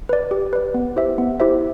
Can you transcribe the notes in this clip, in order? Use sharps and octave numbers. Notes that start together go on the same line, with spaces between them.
B4 D5
G4
B4 D5
B3
E4 G4 C5 E5
B3
E4 G4 C5 E5